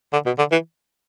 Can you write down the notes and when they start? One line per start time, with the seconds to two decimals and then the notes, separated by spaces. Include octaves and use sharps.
0.13 D3
0.26 B2
0.39 D3
0.52 E3